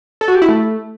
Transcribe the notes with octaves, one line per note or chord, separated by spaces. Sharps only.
A4
F#4
G4
E4
A3